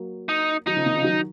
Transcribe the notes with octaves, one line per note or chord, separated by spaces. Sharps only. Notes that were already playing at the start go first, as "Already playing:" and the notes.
Already playing: F#3 A#3
D#4
D#3 F#3 D#4
C#3 F3
C3 D#3
C#3 F3
D#3 F#3